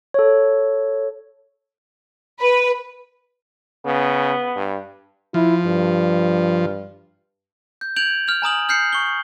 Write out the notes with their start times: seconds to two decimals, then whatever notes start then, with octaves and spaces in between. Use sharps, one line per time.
0.14 A4 C#5
2.40 B4
3.85 C#3 B3
4.56 G2
5.34 F3 E4
5.66 G2
7.81 G6
7.96 G6 G#6 D7 F7 F#7
8.27 F6 G6 F7
8.42 G#5 A#5 D#6 F#7
8.69 F6 G6 C7 C#7
8.93 C#6 G7